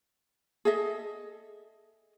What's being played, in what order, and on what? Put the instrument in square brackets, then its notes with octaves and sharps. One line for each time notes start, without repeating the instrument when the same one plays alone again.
[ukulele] G#4 A4 D#5 E5